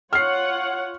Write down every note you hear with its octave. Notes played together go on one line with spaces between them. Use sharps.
F4 C#5 F#5 F6 C7